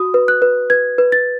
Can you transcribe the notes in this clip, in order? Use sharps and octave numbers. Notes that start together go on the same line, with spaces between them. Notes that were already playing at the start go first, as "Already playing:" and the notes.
Already playing: F#4 D#6
B4
F#6
B4
B4 G#6
B4
A6